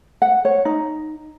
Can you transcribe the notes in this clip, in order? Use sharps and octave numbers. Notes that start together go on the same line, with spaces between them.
F#5
C#5
D#4